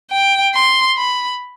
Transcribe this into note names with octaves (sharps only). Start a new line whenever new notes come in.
G5
C6
B5